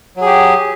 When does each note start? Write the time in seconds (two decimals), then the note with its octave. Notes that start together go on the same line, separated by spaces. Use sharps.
0.17 F#3
0.21 G#4
0.26 G4